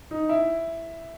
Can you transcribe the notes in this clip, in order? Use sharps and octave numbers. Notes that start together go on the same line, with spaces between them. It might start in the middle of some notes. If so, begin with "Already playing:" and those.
D#4
E4